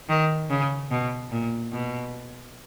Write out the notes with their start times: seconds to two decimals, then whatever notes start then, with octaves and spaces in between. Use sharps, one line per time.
0.09 D#3
0.50 C#3
0.91 B2
1.31 A#2
1.72 B2